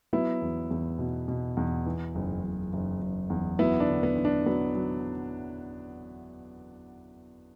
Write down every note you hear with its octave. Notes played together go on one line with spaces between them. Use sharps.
F#3 B3 E4
E2
E2
B2
B2
E2
E3
F#1
F#1
F#1
F#1
E2
F#3 B3 E4
D4
D3
B3
D3
D4
F#3 B3
F#3